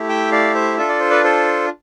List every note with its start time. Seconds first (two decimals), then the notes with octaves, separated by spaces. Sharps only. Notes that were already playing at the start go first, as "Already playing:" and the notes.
Already playing: A3 E4 G4
0.09 E5 G5
0.32 D5 F5
0.55 C5 E5
0.77 D4 F4 A4 E5
0.89 D5
1.00 C5
1.10 B4 D5
1.24 A4 C5